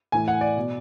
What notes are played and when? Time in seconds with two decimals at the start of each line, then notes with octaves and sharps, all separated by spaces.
0.12 A2 E3 G#5
0.28 F#5
0.41 D5
0.57 B2